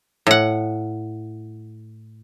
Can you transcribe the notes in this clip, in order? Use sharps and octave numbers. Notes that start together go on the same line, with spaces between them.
A2 F#5